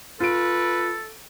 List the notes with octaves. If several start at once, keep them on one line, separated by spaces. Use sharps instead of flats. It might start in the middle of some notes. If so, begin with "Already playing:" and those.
F4 A4 B4 D7